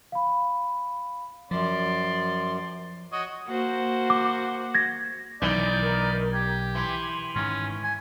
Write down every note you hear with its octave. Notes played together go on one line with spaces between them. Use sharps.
F5 B5
F#2 F3 D5 C6
F#4 C#5 D#5
A#3 F#4 C5
D6
G#6 A#6
B1 D#3 E3 D#4 D5
A#4
G4 G#6
E3 C6
G#2 D#3 C#4
G#5